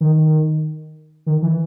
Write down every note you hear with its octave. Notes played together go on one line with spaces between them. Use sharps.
D#3
D#3
E3